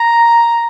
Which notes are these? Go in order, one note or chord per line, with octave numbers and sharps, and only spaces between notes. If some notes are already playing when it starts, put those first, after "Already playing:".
Already playing: A#5